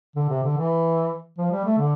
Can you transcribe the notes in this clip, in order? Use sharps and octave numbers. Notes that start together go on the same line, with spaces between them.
D3
C3
D3
E3
F3
G3
A3
D3